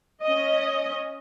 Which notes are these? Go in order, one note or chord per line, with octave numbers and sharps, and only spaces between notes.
C#4 D#5